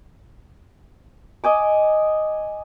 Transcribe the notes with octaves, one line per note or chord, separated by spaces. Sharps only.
D#5 G#5 D6